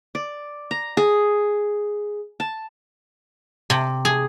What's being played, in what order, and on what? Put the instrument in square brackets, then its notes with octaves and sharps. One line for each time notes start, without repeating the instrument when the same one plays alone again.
[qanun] D5
A#5
G#4
A5
[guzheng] C3
G#4